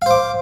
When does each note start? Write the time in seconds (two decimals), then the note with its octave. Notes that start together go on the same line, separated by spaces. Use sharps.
0.02 F5
0.06 C5
0.11 D6